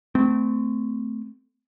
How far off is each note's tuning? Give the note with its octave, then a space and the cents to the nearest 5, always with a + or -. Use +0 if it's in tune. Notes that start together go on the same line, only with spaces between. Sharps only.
A3 +0 C4 -30